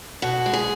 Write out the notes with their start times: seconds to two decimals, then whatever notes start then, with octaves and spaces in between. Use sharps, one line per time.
0.22 B2 F#4
0.46 G#3
0.53 G#4